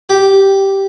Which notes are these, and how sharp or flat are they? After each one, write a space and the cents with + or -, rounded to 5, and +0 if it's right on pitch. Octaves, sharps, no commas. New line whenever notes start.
G4 -5